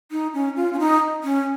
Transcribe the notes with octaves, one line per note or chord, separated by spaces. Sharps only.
D#4
C#4
F4
C#4
D#4
C#4